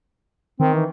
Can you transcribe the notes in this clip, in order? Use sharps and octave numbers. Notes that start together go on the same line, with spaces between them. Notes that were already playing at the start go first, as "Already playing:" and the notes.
D#3 C4
E3